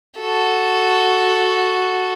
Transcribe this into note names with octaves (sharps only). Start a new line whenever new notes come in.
F#4 A4